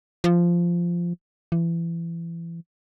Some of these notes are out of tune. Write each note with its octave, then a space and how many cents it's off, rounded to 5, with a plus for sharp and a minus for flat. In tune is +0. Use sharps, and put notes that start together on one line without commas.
F3 -10
E3 +30